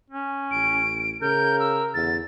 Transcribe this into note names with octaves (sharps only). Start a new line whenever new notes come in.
C#4
A1 D7
C#3 A#4 G6
E6
E2 D3 A6